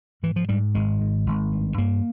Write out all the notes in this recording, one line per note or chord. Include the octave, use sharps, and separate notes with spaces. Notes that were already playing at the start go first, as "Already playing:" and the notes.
G#2 E3
F3
G#2 G3
G#1 G#3
G#2
G#1
G2
G2 A#3